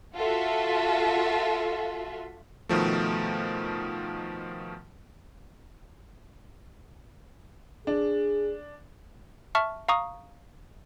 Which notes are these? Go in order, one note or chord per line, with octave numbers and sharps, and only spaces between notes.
F4 F#4 A4 E5
B2 D#3 F3 A3
D4 G#4
E5 A5 C#6 F6
F5 A#5 C#6 D#6